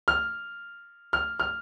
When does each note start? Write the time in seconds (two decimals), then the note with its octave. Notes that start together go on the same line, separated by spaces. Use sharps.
0.08 F6
1.13 F6
1.40 F6